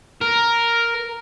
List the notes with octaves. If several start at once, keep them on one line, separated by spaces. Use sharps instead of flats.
A#4